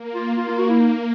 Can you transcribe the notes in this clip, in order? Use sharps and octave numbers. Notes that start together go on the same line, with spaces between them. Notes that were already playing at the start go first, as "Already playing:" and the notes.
Already playing: A#3
F4
A#3 F4
F4
F#4
E4
D#4